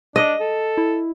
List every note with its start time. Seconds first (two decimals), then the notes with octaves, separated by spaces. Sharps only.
0.16 D4 D#5
0.40 A4
0.78 E4